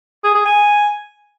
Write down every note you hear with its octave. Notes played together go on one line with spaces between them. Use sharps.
G#4
G#4
G#5